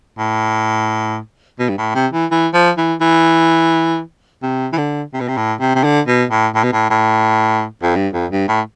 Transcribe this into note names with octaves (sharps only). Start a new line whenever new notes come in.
A2
B2
G2
A2
C3
E3
E3
F3
E3
E3
C3
E3
D3
C3
B2
C3
A2
C3
C3
D3
B2
A2
A2
B2
A2
A2
F2
G2
F2
G2
A2